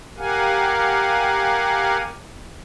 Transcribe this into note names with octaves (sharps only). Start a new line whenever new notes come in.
G4 A#4 F5 F#5 G#5